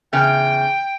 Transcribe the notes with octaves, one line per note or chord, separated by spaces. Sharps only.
E2 C#3 G5